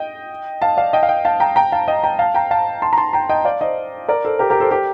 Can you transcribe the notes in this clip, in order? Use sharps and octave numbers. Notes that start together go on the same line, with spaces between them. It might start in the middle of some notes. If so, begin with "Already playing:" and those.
Already playing: D#5 G5
F5 A5
D5 F5
D#5 G5
F5
D#5 G5
F5 A5
G5 A#5
G5 A#5
F5 A5
D#5 G5
G5 A#5
F5 A5
G5 A#5
F5 A5
A5 C6
A#5
A5 C6
G5 A#5
D#5 G5
D5 F5
C5 D#5
A#4 D5
A4 C5
G4 A#4
G4 A#4
A4 C5
G4 A#4